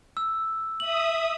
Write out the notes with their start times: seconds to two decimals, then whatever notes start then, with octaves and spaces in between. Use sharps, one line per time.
0.17 E6
0.80 E5 D#6 F#7